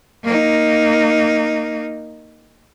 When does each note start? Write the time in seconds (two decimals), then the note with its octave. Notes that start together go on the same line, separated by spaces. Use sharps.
0.23 A#3 D#4